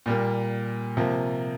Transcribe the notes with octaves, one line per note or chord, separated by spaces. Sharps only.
A#2 G3 A#3
C3 F3 A#3